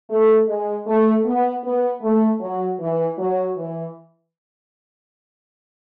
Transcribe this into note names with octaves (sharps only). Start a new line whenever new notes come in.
A3
G#3
A3
B3
B3
A3
F#3
E3
F#3
E3